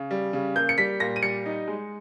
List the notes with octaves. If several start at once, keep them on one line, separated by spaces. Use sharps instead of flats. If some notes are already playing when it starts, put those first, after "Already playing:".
Already playing: C#3
G3
C#3
A#3 G6
C#7
G3 B6
A#2 A#6
D#7
G3 C#7
D#4
G#3